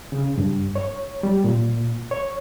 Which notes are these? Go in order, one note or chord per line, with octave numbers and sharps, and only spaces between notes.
C#3
G2
C#5
G3
A#2
C#5